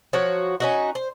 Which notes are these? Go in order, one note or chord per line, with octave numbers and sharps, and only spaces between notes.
F3 F#3 F#4 C#5
C#4 D#4 F#4
C5